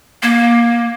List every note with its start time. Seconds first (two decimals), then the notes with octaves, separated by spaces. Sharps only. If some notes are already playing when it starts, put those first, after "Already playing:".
0.23 A#3